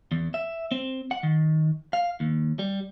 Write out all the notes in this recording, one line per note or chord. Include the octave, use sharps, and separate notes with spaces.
E2
E5
C4
F#5
D#3
F5
D#2
G3